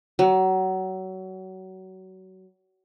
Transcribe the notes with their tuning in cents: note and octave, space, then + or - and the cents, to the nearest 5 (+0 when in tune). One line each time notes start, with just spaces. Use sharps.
F#3 +25